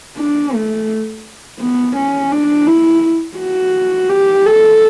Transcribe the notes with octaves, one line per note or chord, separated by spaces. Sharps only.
D4
A3
B3
C#4
D4
E4
F#4
G4
A4